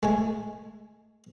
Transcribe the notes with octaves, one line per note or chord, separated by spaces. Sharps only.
G#3 A3 G#5